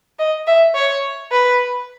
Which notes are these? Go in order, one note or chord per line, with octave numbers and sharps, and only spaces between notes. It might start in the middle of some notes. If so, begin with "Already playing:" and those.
D#5
E5
C#5
B4